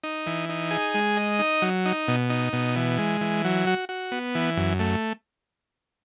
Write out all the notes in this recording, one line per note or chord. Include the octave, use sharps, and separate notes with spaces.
D#4
E3
D#4
G#4
G#3
D#5
D#4
F#3
D#4
B2
D#4
B2
E3
G#3
E3
F#3
F#4
F#4
B3
E3
F#2
A3